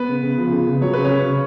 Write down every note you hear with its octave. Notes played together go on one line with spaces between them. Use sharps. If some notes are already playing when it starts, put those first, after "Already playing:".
Already playing: B3 B4
C#3
C#3
F3
C#3
C#3
F#3 C#5
C#3 B4
C#4 C#5
C#3
C#3